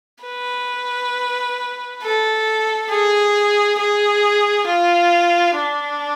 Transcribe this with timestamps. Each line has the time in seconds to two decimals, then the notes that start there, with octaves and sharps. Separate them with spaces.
0.25 B4
2.03 A4
2.90 G#4
3.79 G#4
4.67 F4
5.56 D4